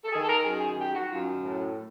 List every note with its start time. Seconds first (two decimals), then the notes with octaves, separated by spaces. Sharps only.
0.04 A4
0.12 D#3 G#4
0.23 A4
0.29 A#4
0.44 F#2 G#4
0.61 G#4
0.77 D#3 G4
0.94 F#4
1.11 F#2 F4
1.43 A2